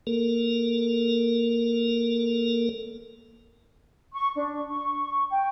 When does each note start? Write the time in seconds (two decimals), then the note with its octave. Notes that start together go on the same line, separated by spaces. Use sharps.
0.07 A#3 A4 A#4
4.13 C#6
4.35 D4
4.70 C#6
5.31 G5